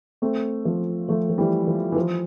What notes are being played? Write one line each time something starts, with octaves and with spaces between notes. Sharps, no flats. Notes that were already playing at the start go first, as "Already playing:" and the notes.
A3 C4
F3 A3
F3 A3
F3
E3 G3
F3
E3
F3